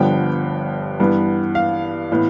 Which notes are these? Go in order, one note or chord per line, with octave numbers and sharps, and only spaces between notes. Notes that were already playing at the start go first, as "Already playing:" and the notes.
Already playing: G1 G2 D3 F3 B3 G5
G2 E3 B3
F5
A2 E3 B3